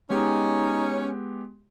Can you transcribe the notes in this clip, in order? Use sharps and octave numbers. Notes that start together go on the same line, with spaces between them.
G#3 B3 C#4 D#4 G4